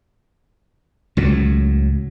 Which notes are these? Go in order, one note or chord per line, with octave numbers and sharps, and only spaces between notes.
C#2 A2 F#3